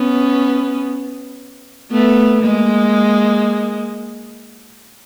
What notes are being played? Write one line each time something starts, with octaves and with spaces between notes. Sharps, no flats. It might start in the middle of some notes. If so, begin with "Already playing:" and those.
Already playing: B3 C#4
A3 B3
G#3 A#3